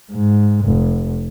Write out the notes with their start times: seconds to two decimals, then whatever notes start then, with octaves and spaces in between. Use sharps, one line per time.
0.11 G#2
0.65 F1